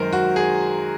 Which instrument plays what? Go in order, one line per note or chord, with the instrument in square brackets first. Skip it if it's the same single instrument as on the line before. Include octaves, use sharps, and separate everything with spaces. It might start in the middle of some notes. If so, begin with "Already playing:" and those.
Already playing: [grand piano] F#2 D#3 G#3 A#4 C5
F#4
G#4